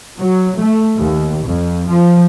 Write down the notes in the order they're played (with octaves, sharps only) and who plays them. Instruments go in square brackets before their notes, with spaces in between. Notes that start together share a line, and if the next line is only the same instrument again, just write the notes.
[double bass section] F#3
A3
D#2
F2
F3